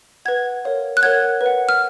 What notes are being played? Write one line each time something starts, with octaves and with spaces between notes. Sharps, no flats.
B4 F#5 G#6
A#4 C#5 F5
F#6
A#4 C#5 F#5 G#6
B4
F#5
F6